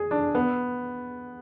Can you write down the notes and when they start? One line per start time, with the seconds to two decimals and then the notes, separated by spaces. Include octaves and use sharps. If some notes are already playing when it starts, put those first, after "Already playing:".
Already playing: G#4
0.11 D4
0.35 B3